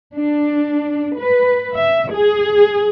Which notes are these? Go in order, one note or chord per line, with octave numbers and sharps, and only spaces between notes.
D4
B4
E5
G#4